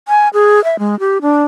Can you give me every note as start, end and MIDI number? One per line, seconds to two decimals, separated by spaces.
0.08 0.29 80
0.34 0.63 68
0.64 0.79 76
0.79 0.98 56
1.00 1.18 67
1.22 1.44 62